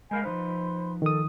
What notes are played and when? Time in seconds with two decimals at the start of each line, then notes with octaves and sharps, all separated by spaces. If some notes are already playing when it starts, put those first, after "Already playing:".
0.11 G#3 A#4 F5 G#5 B5 G6
0.24 F3 D#4 B4 C5 B5 C6
1.02 D#3 A4 D#6